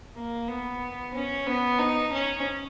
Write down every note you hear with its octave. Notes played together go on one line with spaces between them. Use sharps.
A#3
B3
C#4
B3
D#4
C#4